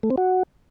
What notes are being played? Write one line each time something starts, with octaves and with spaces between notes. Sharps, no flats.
A3
C4
F#4